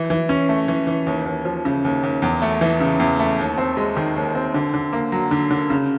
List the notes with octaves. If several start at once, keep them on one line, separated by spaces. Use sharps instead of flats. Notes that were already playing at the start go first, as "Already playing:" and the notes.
Already playing: E3
E3
C#4
A3
E3
E3
D#2
D#2
F3
C#3
D#2
D#2
E2
A3
E3
C#3
E2
A3
D#2
C4
G#3
D#3
D#2
C4
D3
D3
A#3
F#3
D3
D3
C#3